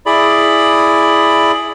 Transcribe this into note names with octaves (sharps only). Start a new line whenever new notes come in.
E4 G#4 D5 B5